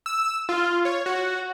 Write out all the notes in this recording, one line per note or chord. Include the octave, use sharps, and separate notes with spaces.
E6
F4
C#5
F#4